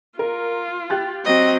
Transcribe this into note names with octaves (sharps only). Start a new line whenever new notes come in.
F4 A#4
G4 F#6 A6
F#3 C4 D#5